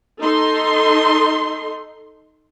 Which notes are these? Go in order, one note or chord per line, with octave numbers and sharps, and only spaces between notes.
D#4 A4 C6